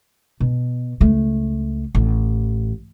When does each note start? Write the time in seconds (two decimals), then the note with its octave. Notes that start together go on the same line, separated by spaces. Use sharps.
0.40 B2
1.00 C#2 A3
1.95 A1